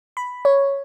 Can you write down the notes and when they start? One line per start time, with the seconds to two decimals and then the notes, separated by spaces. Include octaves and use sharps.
0.17 B5
0.45 C#5